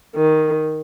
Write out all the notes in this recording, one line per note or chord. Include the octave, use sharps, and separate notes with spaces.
D#3